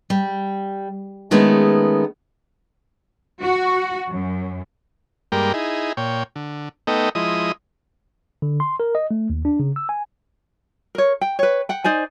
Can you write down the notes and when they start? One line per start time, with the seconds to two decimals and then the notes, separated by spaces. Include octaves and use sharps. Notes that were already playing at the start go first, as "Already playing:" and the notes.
0.10 G3
1.31 D#3 G#3 A3 B3 C#4
3.41 F#4
4.10 F#2
5.32 G2 G3 G#3 A#3 A#4 G5
5.54 D#4 E4 G#4
5.97 A#2 C#5 G5
6.36 D3
6.87 A3 B3 D#4 A4 D#5 G5
7.15 F3 G#3 E4 D#5 D#6
8.42 D3
8.60 C6
8.80 A#4
8.95 D#5
9.11 A3
9.30 D#2
9.45 D4
9.59 C#3
9.76 E6
9.89 G#5
10.95 A#4 C#5
11.21 G5
11.39 B4 C#5
11.69 F#5 G5
11.84 D#4 C5 D5 G#5